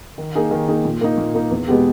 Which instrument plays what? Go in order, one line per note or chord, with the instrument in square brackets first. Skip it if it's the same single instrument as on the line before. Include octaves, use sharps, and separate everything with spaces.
[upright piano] D#3
A#3 D#4 G#4
D#3
A#3 D#4 G#4
A#2
A#3 D#4
A#2
A#3 D#4
E2
B2 G#3 B3 G4